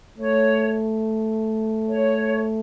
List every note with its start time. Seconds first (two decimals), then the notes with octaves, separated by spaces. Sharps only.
0.18 A3 C#5
1.88 C#5